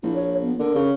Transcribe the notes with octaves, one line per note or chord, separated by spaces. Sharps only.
A#1 E4
C#5
B3
D3 A#4
C#3